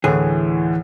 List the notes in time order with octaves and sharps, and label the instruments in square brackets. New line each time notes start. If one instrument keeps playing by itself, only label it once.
[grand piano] D2 A2 [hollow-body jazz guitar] E3 G#4